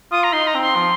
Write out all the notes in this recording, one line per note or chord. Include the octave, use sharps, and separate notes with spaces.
F4 D#6
A#5
D#4 C6
A#5
C4
C6
F3